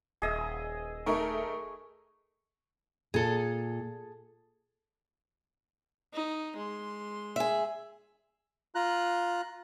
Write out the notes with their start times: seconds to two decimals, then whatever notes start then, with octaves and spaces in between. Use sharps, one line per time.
0.22 D#1 G#4 D#5 E5
1.06 A3 D#4 A#4 C#6
3.14 A#2 G#4 A4
6.14 D#4
6.57 G#3 C6
7.36 G#4 E5
8.75 F4 A#5 F#6